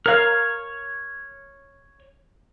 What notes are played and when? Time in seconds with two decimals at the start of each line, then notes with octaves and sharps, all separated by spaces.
0.06 A#4 C#5 F5 F6